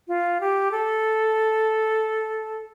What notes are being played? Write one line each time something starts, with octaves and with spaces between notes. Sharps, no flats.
F4
G4
A4